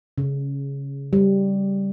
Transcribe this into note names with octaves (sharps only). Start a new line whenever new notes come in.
C#3
G3